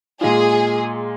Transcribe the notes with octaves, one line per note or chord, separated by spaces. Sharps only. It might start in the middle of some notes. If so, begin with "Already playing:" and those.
A#2 G#3 F4 G#4